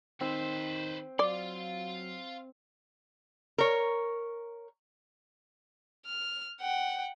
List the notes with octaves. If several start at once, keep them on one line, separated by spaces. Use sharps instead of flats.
D#3 C4 B4 C5
F#3 D5 F5 C6
A#4 C#5
F6
F#5 G5